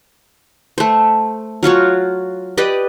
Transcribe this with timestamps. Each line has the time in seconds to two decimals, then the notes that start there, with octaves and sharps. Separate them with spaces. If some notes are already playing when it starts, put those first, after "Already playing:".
0.78 A3 C5
1.63 F#3 F4 F#4 C#5
2.58 G4 B4 D5 D#5